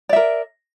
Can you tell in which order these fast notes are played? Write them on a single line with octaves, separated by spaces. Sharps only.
D5 E5 A#4